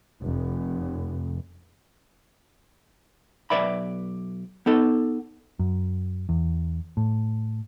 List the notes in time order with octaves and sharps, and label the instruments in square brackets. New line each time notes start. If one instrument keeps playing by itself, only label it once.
[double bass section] F1
[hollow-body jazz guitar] B1 C3 B4 D5 E5 B5
B3 D#4 A4
[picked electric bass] F#2
E2
A2